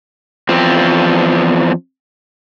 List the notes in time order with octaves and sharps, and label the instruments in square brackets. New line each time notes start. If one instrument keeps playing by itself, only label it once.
[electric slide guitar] E2 F3 C4